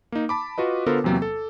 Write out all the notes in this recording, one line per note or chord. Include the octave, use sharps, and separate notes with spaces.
A#3 D#4
A5 B5 D6
F4 F#4 B4 D#5
D3 B3 F4 A4 A#4 C5
E2 C3 F#3 A#3 C4
A4